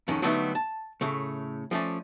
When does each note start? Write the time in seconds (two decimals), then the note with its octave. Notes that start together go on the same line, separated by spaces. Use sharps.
0.08 F2 G#2 D#3 C#4
0.22 D3 F#3 G3 A3 B3 D#4
0.55 A5
1.01 A2 C#3 A3
1.71 F3 A3 C#4 D5